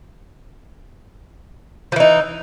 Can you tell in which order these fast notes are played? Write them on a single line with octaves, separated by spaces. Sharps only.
F3 E3 D#4